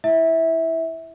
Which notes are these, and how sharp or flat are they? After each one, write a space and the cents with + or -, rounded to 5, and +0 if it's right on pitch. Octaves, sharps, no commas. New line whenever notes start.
E4 -5 E5 -15